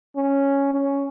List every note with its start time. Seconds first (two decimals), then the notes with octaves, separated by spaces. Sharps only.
0.16 C#4
0.74 C#4